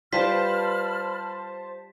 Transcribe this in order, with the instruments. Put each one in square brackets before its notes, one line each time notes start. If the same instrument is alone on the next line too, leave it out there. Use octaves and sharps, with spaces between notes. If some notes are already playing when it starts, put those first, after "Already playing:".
[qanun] G3 F4 B4 [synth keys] C5 A5 [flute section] B5 F6 [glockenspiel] B6